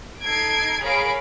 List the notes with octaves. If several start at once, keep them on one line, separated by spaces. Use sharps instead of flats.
D#4 A4 G#6 C7 D7
G#4 A#4 C#5 F5 B5 D7